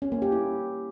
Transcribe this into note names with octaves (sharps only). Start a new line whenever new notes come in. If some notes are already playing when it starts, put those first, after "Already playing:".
C#4
A#3
G4
E4